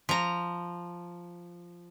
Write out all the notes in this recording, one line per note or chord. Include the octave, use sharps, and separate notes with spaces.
F3 A#5